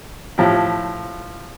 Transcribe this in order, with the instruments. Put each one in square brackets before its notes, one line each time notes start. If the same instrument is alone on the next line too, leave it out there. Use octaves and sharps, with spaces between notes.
[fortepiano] A2 F3 G4